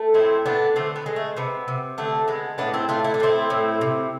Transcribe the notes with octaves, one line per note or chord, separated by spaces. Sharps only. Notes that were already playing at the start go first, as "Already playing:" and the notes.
Already playing: A3
A2 C4 E4
A3 B3 D4
D3 A3 C4
B3
G#3
A3
C3 B3
C3
D3 A3
G#3 B3
A2 B3 D4
C4 E4
A3 D4 F4
E4
D4
A2 C4 E4
A2
C3